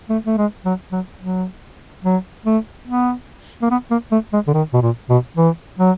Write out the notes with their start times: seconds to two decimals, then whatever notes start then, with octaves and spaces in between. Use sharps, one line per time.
0.09 A3
0.26 A3
0.38 G#3
0.65 F#3
0.92 F#3
1.21 F#3
2.04 F#3
2.45 A3
2.88 B3
3.62 A#3
3.70 B3
3.91 A#3
4.11 A3
4.33 G#3
4.47 D3
4.54 D#3
4.73 B2
4.82 A#2
5.09 B2
5.37 E3
5.79 F#3